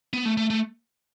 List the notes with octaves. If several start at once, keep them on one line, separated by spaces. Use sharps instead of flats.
B3
A3
A3
A3